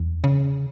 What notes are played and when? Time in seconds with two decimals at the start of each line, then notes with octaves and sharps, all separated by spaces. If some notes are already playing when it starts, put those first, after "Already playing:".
Already playing: E2
0.24 C#3